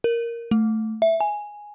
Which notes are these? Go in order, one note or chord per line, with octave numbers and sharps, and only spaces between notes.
A#4
A3
E5
G#5